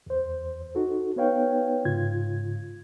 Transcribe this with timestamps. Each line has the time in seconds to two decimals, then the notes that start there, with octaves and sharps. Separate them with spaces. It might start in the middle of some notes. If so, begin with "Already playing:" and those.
0.06 E2 C5
0.75 D#4 F#4 A4
1.16 B3 D#4 B4 C#5 F5 G5
1.85 G#2 C#3 F4 G#6